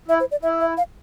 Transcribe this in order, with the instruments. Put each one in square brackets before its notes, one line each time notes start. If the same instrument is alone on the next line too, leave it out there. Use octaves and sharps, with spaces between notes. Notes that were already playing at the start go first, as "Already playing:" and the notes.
[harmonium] E4 [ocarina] E5
[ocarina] C5
D5
[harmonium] E4 [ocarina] E5
[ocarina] E5
F5